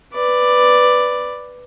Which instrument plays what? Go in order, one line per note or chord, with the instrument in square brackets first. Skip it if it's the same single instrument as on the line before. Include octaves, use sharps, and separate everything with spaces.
[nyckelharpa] B4 D5